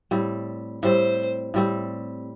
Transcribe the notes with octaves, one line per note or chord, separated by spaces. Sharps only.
A2 G3 C4
A2 G3 C4 C5
A2 G3 C4